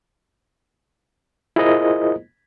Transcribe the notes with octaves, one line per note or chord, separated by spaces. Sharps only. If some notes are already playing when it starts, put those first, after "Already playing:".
E4 F4 G#4 A#4 C5 D#5